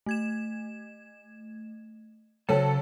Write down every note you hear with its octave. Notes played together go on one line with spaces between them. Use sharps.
A3 G#6 E7
C#3 F#3 A4 C5 G5 A5 C#7